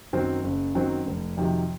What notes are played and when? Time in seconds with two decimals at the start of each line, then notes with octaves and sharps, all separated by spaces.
0.13 F#2 D#3 F#3 C4
0.44 F#1
0.75 F#2 D#3 F#3 C4
1.06 F1
1.37 F2 C3 D#3 F#3